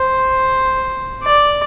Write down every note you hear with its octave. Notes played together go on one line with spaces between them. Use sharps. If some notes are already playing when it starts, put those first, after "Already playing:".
Already playing: C5
D5